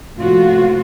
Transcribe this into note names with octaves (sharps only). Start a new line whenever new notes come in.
A2 C3 F3 A#3 F4 F#4